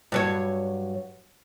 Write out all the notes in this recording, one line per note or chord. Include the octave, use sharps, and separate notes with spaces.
G2 F#3 C#5